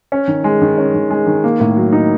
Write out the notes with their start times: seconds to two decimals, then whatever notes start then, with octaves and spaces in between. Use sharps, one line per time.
0.12 C#4
0.28 D#3
0.44 G#3
0.62 D#3
0.78 C#4
0.95 D#3
1.10 G#3
1.27 D#3
1.44 A#3
1.60 A2
1.76 F#3
1.93 D#4